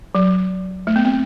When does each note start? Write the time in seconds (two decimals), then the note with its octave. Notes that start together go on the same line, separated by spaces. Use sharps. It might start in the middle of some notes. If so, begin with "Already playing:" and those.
0.15 F#3
0.87 A3
0.96 B3
1.05 C4